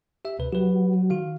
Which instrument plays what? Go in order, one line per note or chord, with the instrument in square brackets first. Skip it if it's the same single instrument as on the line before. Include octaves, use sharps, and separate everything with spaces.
[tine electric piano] G4 E5
D2 C3 B4
[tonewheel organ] F#3 [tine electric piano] G4 B4
[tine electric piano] D#3 F#4 F5